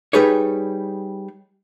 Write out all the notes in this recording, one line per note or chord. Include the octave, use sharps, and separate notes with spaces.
G3 D#4 G#4 B4 C#5